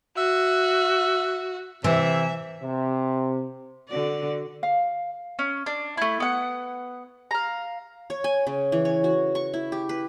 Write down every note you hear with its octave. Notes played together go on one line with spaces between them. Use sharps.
F#4 E5
C3 E3 E5
C3
D3 F#4 D5
F5
C#4
D4
A3 E4
B3 F#5
F5 A#5
C#5
G#5
C#3
E3
C#5
F#4
C#6
E4
G4
B4